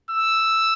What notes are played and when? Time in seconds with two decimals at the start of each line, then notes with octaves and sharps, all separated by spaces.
0.11 E6